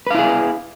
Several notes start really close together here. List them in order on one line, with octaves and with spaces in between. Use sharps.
B4 F5 E4 G#4